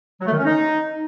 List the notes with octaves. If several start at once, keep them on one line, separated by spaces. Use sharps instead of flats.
F#3
A3
D#3
C#4
D#4